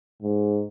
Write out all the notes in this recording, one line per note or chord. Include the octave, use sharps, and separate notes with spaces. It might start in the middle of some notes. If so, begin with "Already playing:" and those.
G#2